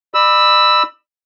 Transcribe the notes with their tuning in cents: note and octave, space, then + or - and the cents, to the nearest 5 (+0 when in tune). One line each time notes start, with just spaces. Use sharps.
D5 +45 B5 +0 E6 +0